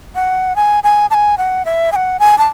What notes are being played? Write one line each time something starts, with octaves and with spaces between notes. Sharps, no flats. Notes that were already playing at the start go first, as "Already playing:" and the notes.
F#5
G#5
G#5
A5
G#5
F#5
E5
G#5
F#5
G#5
A5